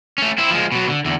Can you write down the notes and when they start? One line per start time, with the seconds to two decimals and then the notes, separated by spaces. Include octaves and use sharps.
0.18 A3 C#4
0.38 C4 E4
0.51 F3 G#3
0.72 B2 F#3
0.89 D3
1.05 E2 D3